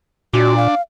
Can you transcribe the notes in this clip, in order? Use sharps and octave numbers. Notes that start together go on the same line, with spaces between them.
A#2 D4 F#4
F5